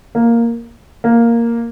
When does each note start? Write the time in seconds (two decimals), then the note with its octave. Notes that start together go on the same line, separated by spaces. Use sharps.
0.15 A#3
1.04 A#3